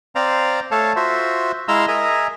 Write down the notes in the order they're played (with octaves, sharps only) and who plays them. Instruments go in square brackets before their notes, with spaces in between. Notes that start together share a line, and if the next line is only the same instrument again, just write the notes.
[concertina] C4 C5 D5 F5 A#5
A3 A4 C#5 F5 A5
F4 F#4 C5 E5
G#3 E4 F5 A#5 C6 E6
G#4 A#4 D#5 E5 G#5 A#5